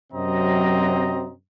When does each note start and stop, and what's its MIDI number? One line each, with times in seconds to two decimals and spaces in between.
0.13 1.32 42
0.13 1.32 48
0.13 1.32 54
0.13 1.32 60
0.13 1.32 75
0.13 1.32 82